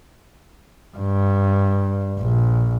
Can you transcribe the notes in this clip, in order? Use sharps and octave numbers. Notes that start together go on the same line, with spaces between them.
G2
A#1